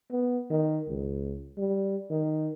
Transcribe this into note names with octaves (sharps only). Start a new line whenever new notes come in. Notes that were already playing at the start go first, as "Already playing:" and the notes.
B3
D#3
C#2
G3
D#3